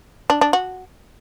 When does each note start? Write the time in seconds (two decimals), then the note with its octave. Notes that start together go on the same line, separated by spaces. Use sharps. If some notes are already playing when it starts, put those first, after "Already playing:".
0.30 D4
0.41 D4
0.53 F#4